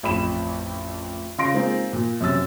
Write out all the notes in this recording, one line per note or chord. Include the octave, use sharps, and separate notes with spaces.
A1 F2 B5 E7
C#3 F4 C6 A#6 D7
G#3 A#3 C4 D#4 F4
A#2
F#2 C3 C#4 E6 A6